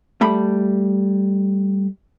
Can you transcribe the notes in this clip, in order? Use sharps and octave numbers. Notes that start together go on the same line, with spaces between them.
G3 A3 B5